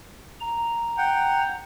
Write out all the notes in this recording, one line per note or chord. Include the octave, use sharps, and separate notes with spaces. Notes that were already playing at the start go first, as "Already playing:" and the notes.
A#5
F#5 G5